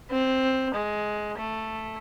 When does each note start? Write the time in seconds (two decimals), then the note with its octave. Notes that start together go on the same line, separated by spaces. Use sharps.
0.10 C4
0.74 G#3
1.38 A3